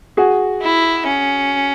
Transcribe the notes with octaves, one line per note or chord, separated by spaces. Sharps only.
F#4 G#4
E4
C#4